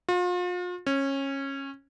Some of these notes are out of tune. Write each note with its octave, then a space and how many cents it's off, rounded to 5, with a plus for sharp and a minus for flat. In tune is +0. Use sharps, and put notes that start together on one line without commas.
F4 +40
C#4 -20